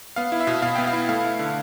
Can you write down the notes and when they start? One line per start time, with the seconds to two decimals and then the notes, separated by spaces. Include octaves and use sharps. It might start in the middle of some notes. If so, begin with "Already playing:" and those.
0.16 B3 F5
0.32 E4
0.41 E5
0.47 B2
0.62 B2 F5
0.75 B3 G5
0.87 F5
0.93 E4
1.09 A3 F5
1.24 E4
1.39 D3